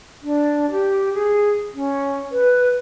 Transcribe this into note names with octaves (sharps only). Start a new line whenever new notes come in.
D4
G4
G#4
C#4
B4